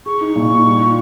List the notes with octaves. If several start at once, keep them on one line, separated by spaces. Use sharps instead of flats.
G#4 C#6
D#4
A#2
D#4
G3
F4